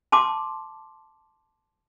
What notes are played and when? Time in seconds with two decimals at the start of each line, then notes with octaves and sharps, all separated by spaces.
0.12 A5 C6 D6